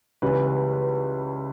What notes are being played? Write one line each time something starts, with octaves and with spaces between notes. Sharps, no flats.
C#2 C#3 E3 G3 B4
B4
B4